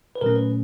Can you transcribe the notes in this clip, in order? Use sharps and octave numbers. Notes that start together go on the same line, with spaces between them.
B4
A#2 F#3 A3 C#4 A#4
B4